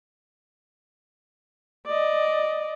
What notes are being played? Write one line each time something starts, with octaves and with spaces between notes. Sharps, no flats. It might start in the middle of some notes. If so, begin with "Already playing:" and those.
D5 D#5